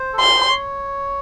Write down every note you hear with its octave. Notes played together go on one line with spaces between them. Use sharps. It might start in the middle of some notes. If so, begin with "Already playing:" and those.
Already playing: C5
A4
A#4 C6
C5
C#5